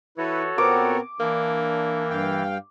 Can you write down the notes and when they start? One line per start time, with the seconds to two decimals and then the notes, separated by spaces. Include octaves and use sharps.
0.18 E3 E4 F#4 A4 B4 C#5
0.58 A#2 B3 C4 A#4 D6
1.20 E3 A#3 D4
2.10 G2 F5 G5